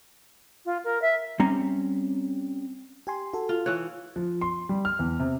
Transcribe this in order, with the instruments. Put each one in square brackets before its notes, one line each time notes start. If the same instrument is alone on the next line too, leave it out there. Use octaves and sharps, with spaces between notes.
[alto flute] F4
A#4
E5
[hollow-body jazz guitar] G3 C4 C#4 A#5
[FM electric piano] G4 G#5 C6
F#4 A4
[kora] F4
[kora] E3 C#5 [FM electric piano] F#6
[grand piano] F3
C6
G3
F6
E2
C3